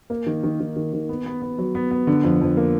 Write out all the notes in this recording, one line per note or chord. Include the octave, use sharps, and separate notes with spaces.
A#3
D#3
D#3
D#3
D#3
D#3
B3
B3
B3
F#3
B3
B3
D3
F2
F2
A#3